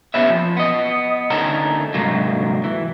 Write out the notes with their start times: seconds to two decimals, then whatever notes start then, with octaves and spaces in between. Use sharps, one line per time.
0.14 B3 C#4 G4 B4 C#5 E5
0.30 F3
0.57 B3 D#5
1.30 D2 C#4 D#4 A4 A#4
1.94 C2 G#2 D3 F#3 A#3
2.64 E3